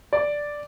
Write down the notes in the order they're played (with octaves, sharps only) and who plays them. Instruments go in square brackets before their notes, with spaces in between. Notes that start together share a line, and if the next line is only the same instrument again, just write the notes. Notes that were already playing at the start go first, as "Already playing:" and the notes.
[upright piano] D5